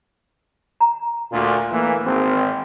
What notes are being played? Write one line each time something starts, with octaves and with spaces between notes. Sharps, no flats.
A#5
D2 A#2
E3 A3 A#3
G#1 C4